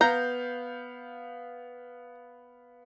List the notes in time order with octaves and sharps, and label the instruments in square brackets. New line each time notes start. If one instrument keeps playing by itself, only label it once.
[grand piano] B3 F5 G6 [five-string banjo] A#5